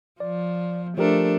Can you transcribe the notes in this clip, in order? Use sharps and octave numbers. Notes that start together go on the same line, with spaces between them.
F3 D5
F3 A3 D4 G4 A#4